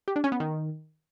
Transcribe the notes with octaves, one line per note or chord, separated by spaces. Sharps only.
G4
D4
C#4
B3
D#3